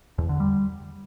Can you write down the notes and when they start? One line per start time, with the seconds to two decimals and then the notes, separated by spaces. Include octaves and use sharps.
0.18 E2
0.29 D3
0.40 G3